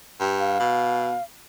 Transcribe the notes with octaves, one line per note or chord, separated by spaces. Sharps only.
G2
F5
B2